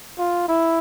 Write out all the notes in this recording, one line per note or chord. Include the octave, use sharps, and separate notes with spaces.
F4
E4